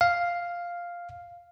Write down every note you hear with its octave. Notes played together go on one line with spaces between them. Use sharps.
F5